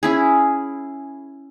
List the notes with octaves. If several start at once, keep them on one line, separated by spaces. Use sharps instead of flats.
C#4 E4 G#4